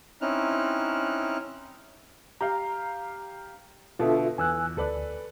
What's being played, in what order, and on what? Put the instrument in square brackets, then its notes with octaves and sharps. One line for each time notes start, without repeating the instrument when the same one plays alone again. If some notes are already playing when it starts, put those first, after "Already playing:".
[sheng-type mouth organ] C4 C#4 D#4 E4 F6 F#6
[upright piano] G4 F5 [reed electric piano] A#5
[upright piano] B2 D3 [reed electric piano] F4 A4 E5
[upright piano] E2 [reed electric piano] G#5 E6 F#6
[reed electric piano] D2 [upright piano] A4 B4 D5